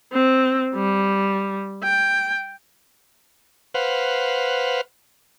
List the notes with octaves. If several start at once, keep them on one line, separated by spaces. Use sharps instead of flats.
C4
G3
G5
B4 C5 F5 F#5